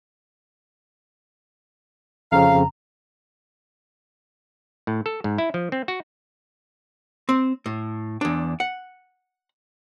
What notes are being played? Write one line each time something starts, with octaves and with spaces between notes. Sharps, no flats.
F2 C#3 C4 F5 A#5
A2
A4
G#2
E4
F3
C4
F#4
C4
A2
E2 D4
F#5